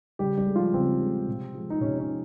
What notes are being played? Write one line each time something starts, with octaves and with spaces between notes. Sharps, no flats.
C#3 G3 G4
G3 G4
G#3
F3 F4
C#3 C4
G#3
C3
F3 G#3
D#4
C3 C#4
C#4
F3